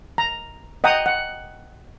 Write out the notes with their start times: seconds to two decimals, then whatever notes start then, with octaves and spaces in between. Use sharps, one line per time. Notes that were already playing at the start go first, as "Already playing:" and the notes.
0.18 A#5
0.84 D#5 F#5 G5 A#5 D#6
1.06 F#5